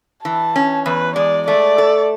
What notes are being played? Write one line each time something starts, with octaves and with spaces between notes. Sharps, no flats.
E3 A5
C#4
E2 B4
G#3 D5
A3 D5
A4